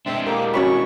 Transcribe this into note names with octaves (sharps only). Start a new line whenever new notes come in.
G#3 C4 D4 E5 C6
A#3 G4 A#4 D6
C#4 F#4 C#5 B5 C#6